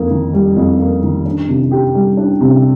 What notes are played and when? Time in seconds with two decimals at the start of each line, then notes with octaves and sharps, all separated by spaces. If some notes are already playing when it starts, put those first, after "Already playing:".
Already playing: F2 A#3
0.10 D#3
0.33 G3
0.57 F2
0.79 A#3
1.03 D#3
1.25 D4
1.49 C3
1.71 G4
1.95 G3
2.17 D4
2.41 C3